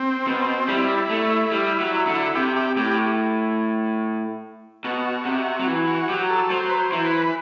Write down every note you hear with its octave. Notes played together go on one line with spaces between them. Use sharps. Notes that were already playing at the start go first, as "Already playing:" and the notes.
Already playing: C4
B2
G3 E4
A3
G3
F#3
D3
C3 G4
G4
A2 G4
B2 F#4
C3
F#3
E3
F#4
F#3 G4
A4
F#3 C5
B4
C5
E3
B4